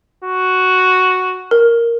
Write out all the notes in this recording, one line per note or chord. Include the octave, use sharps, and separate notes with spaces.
F#4
A#4